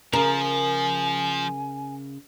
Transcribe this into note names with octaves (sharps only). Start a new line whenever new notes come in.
C#3 F3 A#4 G#5